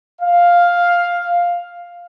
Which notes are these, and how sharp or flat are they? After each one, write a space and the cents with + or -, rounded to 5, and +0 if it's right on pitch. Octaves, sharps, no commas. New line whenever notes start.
F5 +5